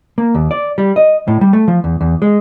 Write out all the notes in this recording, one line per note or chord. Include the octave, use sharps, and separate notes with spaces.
A#3
D#2
D5
G3
D#5
A2
G3
A3
F3
E2
E2
G#3